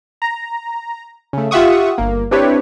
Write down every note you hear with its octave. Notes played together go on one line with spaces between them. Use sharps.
A#5
C#3 A3
F4 G4 E5 F#5 C#6 D#6
G1 A#3
C4 D4 E4 G4 B4 C#5